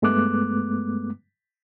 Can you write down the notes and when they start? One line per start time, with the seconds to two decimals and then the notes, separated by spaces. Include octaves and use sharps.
0.02 G2 G#3 A3 B3 D6 F#6